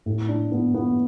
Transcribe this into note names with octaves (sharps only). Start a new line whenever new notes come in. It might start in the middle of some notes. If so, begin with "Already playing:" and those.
A2
D4
B3
B3